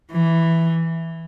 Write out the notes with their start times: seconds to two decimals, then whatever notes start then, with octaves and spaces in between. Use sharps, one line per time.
0.11 E3